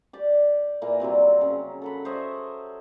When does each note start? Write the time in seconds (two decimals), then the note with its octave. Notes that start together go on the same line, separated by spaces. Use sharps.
0.13 G4 D5
0.82 A#2 E3 A#3
1.00 C3 F#3 G3 C4
1.41 C#3
1.82 A4 F#5 B5
2.05 C5 C#5 D#5 E5